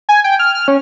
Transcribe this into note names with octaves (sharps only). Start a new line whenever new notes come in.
G#5
G5
F6
F6
C#4